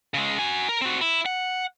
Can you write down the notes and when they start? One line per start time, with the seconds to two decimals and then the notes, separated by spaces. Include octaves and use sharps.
0.14 C#3 G#3
0.39 F#4 G#5
0.69 A#4
0.81 C4 F#4
1.01 E4
1.26 F#5